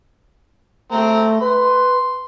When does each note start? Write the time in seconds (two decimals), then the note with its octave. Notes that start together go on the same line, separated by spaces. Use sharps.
0.92 A3 C4 A#5
1.42 B4 C6